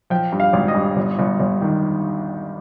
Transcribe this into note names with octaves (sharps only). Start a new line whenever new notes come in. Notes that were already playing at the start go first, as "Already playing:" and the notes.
F3 G5
G2
F5
G#1
D#5
G2
G1
G1
G1
D#3